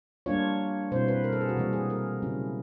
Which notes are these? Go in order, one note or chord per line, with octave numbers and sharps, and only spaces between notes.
G3 A#3 D4 F4 C#5
B2 G3 C4 E4 C5
B4
A#4
A4
G#4
F#4
C3 E3 G3 A#3
G#4
A#4
C#3 F#3 A3 C#4 E4